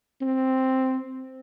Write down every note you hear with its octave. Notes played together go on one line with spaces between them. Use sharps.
C4